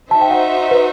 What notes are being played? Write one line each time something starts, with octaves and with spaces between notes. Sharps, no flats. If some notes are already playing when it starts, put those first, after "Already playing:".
D#4 F#4 C5 E5 A5
G5
F#5
B4